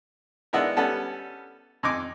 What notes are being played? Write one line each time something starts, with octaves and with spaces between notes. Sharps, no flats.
G#3 B3 D4 E4 A#4
G3 B3 C#4 A4
F2 D#4 G#5 D6